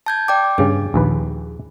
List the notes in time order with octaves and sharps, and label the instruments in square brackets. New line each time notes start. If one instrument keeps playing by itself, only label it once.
[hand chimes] A5 G6 G#6
D5 G5 D6
[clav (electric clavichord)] G2 C#3 [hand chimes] G#4
[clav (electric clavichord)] A#1 D#2 B4